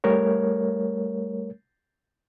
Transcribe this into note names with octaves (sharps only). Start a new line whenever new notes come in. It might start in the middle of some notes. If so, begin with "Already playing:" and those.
G3 A3 A#4 C#5